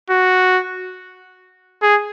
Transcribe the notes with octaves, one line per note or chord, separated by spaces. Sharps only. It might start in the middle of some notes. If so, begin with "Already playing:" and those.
F#4
G#4